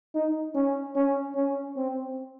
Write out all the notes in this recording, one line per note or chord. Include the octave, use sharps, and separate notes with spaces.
D#4
C#4
C#4
C#4
C4